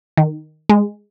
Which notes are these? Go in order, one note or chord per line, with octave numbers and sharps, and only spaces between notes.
D#3
G#3